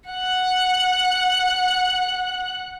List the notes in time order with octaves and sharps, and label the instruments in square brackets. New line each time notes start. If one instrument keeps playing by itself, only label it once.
[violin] F#5 F#6